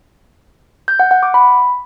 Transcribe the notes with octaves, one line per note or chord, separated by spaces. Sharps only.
G6
F#5
F#5
D6
B5